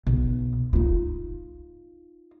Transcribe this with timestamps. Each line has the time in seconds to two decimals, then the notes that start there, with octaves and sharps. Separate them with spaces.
0.07 B1
0.73 D#4 F4